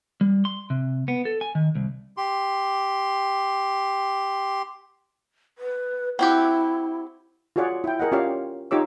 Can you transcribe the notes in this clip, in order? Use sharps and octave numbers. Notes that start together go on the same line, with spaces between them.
G3
C6
C3
B3
A4
G#5
D#3
C2
G4 C6
B4
C4 E4 F#4 G4
F4 F#4 G#4 C#5 D5 F#5
E4 G5
G#4 A#4 D#5 F#5
C#4 F4 G4 C#5 D5 F5
D#4 F4 G4 C#5 D6 E6